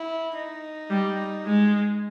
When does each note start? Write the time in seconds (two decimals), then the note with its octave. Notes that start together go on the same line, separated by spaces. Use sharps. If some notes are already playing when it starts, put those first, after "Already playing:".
Already playing: E4
0.36 D#4
0.90 G3
1.46 G#3